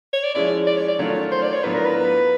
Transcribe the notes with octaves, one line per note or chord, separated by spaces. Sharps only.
C#5
D5
F3 G#3 C#4 E4 D5
D5
C#5
D5
D#3 F#3 A3 C#4 F4 C#5
C5
D5
C#5
A2 F#3 B3 D4 F4 B4
A#4
B4